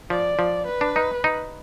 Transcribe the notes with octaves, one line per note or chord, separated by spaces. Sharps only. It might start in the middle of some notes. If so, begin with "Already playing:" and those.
F3 D5
F3
B4
D4
D#4
D#4